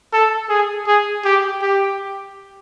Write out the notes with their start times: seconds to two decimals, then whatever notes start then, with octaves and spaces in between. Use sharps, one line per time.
0.13 A4
0.49 G#4
0.87 G#4
1.25 G4
1.62 G4